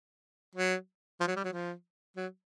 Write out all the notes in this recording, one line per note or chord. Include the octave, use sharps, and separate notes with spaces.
F#3
F3
F#3
G3
F#3
F3
F#3